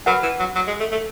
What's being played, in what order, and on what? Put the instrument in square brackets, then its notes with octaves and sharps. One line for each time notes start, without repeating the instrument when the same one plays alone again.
[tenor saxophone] F#3 [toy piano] B4 F#5 B5
[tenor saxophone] E3
F#3
F#3
G#3
A3
A3